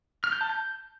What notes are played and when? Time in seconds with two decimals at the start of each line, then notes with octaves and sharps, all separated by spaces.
0.24 F6
0.32 G6
0.41 A5
0.49 G6